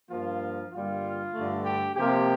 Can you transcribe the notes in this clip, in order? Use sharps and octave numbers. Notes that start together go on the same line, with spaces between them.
G2 F3 A#3 F4
G2 D3 G3 A#3 F4
G2 D3 A3
G4
C3 F3 A#3 G4